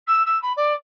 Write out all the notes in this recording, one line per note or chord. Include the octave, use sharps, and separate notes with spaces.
E6
E6
B5
D5